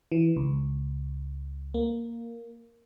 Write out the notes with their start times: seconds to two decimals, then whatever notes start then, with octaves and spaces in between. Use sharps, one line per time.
0.12 E3
0.36 C#2
1.74 A#3